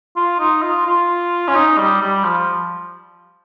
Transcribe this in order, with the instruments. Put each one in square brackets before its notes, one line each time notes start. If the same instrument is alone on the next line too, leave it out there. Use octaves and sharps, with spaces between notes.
[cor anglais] F4
D#4
F4
F4
C#4
D#4
G3
G3
F3